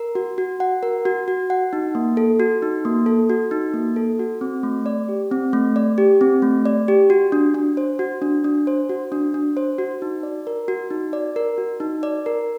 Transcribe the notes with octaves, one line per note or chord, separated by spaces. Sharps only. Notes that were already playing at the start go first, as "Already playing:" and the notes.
Already playing: A#4
F#4
F#4
F#5
A#4
F#4
F#4
F#5
D#4
A#3
A4
F#4
D#4
A#3
A4
F#4
D#4
A#3
A4
F#4
C4
A3
D5
G4
C4
A3
D5
G4
C4
A3
D5
G4
F#4
D4
D4
C5
F#4
D4
D4
C5
F#4
D4
D4
C5
F#4
D#4
D5
A#4
F#4
D#4
D5
A#4
F#4
D#4
D5
A#4